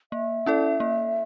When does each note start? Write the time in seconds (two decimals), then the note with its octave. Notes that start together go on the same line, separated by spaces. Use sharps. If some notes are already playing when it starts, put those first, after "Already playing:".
0.12 A#3 E5
0.46 C#4 E4 A4 D5
0.80 A#3